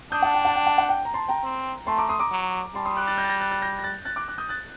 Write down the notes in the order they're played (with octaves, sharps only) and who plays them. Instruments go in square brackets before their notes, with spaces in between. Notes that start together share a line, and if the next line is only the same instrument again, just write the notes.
[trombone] D4 [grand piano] D#6 G6
[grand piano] F#5 A5
G5
F#5 A5
G5
F#5 A5
F#5
G5
A#5
A5 C6
G5 A#5
[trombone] C4
[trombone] A3 [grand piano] A5 C6
[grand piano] A#5 D6
C6 D#6
A#5 D6
[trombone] F#3
[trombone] G3 [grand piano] A5 C6
[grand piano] C6 D#6
D6 F#6
F#6 A6
G6 A#6
A6
G6 A#6
F#6 A6
F#6 A6
G6 A#6
A#6
F#6 A6
F#6 A6
D6 F#6
D6 F#6
D#6 G6
F#6 A6